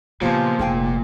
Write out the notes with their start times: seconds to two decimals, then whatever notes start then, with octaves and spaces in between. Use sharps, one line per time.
0.22 A#2 C#3 F3 F#3 B3 D4 G4
0.59 F1 D#4 G#4 G5 G#5